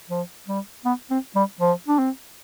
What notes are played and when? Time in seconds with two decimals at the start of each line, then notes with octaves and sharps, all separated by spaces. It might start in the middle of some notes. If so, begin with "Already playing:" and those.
0.10 F3
0.48 G3
0.85 B3
1.10 C4
1.36 G3
1.61 F3
1.88 D4
1.99 C4